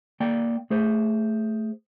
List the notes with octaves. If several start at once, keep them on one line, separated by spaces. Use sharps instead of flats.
A#3 D5 G5
A3 G#4 C5